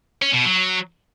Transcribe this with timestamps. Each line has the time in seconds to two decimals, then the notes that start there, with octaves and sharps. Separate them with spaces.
0.22 C#4
0.34 B2
0.45 F#3